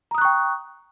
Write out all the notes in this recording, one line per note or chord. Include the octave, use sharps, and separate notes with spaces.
G5 A#5 C#6 D#6 F#6